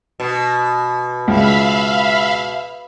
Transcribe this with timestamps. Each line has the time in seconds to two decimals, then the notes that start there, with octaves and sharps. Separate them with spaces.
0.20 B2
1.28 C#2 E5 F5 B5